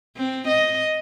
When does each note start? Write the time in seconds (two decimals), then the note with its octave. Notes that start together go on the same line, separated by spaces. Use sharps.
0.17 C4
0.48 D#5